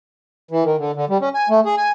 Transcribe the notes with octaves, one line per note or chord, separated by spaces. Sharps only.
E3
D#3
D3
D3
G3
C#4
G#5
A3
G#4
G#5